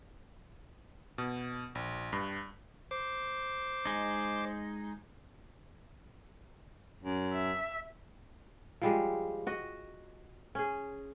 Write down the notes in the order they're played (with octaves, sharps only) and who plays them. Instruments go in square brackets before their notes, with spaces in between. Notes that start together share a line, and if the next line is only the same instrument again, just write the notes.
[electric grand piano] B2
A#1
G2
[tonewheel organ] C5 D6
[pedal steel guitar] G#3 D#4
[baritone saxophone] F#2
[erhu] E5
[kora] F3 G3 G#3
F#4 D#5
C#4 G#4